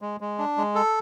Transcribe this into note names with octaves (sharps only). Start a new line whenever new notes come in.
G#3
G#3
D4
G#3
A4